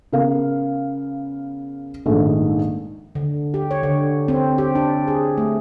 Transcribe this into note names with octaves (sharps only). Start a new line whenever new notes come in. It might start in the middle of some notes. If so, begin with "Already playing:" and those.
C#3 B3 A#4 F5
A#1 G#2 D#3 G#3 A3
D3
G4
C#5
D3
C4
G4
D4
G#4
A3